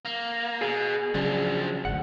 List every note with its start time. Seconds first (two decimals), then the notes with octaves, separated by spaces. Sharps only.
0.05 A#3
0.61 B2 G#4
1.14 C#3 F3 F#3 D4
1.85 G#1 D2 F#5